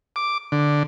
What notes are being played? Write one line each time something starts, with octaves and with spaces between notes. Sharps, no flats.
D6
D3